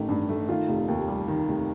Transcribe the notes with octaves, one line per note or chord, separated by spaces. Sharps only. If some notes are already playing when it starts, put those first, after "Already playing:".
Already playing: A1 D#3 A3
G2
A3
D#3 F4
F1
D#2
G3
D#3
F1